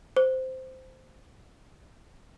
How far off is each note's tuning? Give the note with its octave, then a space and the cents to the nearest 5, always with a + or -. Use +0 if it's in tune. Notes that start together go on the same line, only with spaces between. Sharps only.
C5 -10